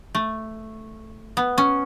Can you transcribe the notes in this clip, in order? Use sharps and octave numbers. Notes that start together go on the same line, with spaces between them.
A3
B3
C#4